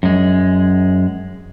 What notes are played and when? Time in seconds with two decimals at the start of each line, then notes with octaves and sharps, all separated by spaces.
0.03 F#2 G#3